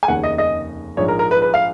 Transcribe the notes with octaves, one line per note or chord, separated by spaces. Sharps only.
G#5
F1 D#2 C#3 F#5
D#5
D#5
A#1 G#2 F3 C#5
A#4
A#4
B4
B4
F5